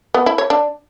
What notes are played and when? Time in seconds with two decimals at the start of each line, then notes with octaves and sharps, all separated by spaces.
0.14 B3
0.26 E4
0.38 C#5
0.50 D4